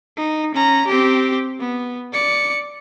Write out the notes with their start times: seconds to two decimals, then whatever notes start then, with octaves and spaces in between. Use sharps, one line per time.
0.17 D#4
0.55 C#4 A#5
0.87 C4 G4
1.60 B3
2.13 D5 C#7